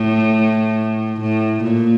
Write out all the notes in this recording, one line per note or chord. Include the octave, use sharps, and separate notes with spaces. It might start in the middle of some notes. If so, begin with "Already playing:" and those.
Already playing: A2
A2
A#2